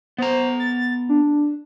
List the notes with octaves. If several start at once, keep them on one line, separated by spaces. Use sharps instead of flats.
B3 C5 A#5
A6
D4